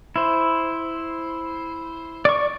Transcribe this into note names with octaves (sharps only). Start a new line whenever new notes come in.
E4 C5
D5 C#6